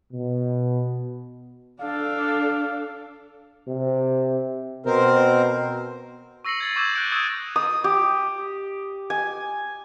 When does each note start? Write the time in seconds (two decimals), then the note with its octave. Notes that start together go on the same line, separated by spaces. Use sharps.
0.13 B2
1.80 D4 A4 F5
3.67 C3
4.86 B2 C4 A#4 C5
6.45 C#6 E6 A#6 C7 C#7 F#7
6.60 G#6 A6 C7
6.76 C#6 D6 E6 G6 G#6 E7
6.96 F#6 G6 D7
7.12 C#6 D#6 E6 G#6 A6 D#7
7.56 D#6
7.84 G4
9.10 G#5